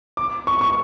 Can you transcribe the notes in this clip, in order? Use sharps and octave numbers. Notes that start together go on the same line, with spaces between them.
D6
C#6
C#6